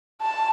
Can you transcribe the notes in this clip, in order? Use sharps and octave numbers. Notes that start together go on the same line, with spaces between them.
A5